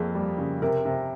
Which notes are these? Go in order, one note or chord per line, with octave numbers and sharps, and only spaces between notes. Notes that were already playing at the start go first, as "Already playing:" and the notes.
Already playing: F2 A#3 G#4
G3
C#3
C3 A#4
C3